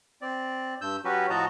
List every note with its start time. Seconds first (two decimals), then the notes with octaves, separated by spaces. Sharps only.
0.22 C4 D5
0.81 G2 E6 G6
1.05 F#3 C#4 F#4 G4 B4
1.30 A2 F3 F#4 D#5 A5 A#5